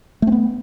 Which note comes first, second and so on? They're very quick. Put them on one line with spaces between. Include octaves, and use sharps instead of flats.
A3 C4 B3